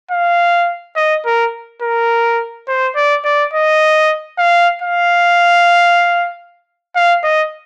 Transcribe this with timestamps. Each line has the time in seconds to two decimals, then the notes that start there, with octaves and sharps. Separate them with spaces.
0.11 F5
0.96 D#5
1.26 A#4
1.82 A#4
2.68 C5
2.95 D5
3.25 D5
3.54 D#5
4.38 F5
4.82 F5
6.96 F5
7.24 D#5